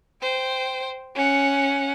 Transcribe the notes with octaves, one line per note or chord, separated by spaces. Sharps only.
C5 G5
C#4 F#5